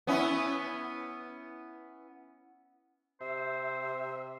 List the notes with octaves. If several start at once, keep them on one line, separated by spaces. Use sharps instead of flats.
B3 C#4 E4
C3 C5 E5